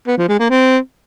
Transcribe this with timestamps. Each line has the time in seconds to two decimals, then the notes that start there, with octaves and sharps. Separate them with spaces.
0.07 B3
0.18 F3
0.28 G#3
0.39 A#3
0.50 C4